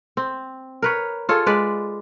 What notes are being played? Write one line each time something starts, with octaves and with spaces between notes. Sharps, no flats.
C4
A#4 B4 C#5
F4 G#4 A4 C#5
G#3 B4 D5